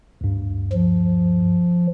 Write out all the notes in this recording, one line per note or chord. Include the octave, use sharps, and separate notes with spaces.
D2 G2
F3